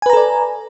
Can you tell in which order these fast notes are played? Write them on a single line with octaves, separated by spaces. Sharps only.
G#5 B4 A#5 A4 D5